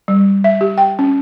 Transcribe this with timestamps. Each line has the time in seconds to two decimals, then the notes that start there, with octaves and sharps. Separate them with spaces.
0.08 G3
0.44 E5
0.61 G4
0.78 G5
0.99 C#4